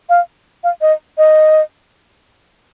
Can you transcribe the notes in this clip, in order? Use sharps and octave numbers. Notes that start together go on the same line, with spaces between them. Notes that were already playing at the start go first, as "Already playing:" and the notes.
F5
F5
D#5
D#5